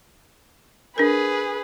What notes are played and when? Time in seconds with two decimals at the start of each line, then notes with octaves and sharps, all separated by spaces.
0.98 D4 G#4 A#4 B4